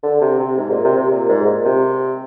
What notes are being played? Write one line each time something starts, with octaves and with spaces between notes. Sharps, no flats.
D3
C3
C3
G#2
A#2
C3
C3
A#2
G#2
A#2
C3